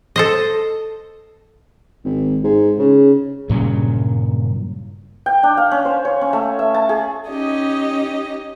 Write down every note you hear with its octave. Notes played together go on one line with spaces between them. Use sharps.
A4 C5 D#5
G#1
G#2
C#3
G2 A#2 C#3 F#3
G5
D4
F5
C#4
C5
C#5
C#4
A3
E5
A5
G#4
C#4 D#4 G4 D#5